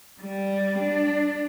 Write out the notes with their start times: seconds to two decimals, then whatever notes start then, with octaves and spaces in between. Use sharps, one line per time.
0.21 G3
0.80 D4